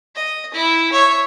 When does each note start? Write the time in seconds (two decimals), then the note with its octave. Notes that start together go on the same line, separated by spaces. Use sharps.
0.15 D#5
0.54 E4
0.92 C#5 E5